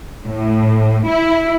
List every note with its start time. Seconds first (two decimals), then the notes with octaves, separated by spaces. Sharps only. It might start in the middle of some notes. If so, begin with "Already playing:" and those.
0.25 A2
1.08 E4